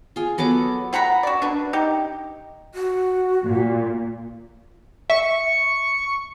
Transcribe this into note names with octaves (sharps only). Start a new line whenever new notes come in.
F4 G#4
F#3 B3 A4 D6
F4 F#5 A#5 B5
F#4 D5
D4 B4
D#4 G4
F#4
A#2
E5 C#6